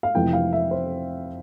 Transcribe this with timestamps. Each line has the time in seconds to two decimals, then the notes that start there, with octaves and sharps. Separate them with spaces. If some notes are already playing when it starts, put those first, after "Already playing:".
0.03 F5
0.15 F2 C3 E3 A3 G5
0.33 F5
0.53 E5
0.71 C5